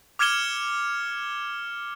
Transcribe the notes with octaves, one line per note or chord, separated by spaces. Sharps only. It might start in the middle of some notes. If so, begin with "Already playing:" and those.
D6 F6 G#6 C#7 E7 G7